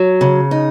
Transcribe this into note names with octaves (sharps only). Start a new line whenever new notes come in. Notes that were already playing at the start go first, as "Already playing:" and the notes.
Already playing: F#3
C#3
D#4